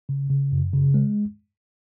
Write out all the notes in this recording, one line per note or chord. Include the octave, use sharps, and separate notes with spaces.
C#3
C#3
F#2
C#3
G#3